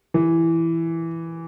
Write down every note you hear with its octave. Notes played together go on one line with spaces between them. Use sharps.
E3